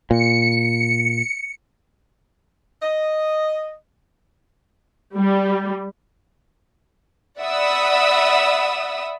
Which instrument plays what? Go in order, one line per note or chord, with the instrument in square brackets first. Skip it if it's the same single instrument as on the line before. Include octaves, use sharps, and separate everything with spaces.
[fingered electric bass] A#2 [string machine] C#7
[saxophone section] D#5
[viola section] G3
[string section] D5 E5 F#5 B5 D#6 E6